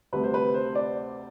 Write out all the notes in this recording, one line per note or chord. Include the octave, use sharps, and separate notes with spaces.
D2 C3 G3 B4
C5
B4
C5
D5